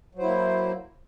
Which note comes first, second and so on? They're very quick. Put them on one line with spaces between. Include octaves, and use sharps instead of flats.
F#3 C5 E4 A#3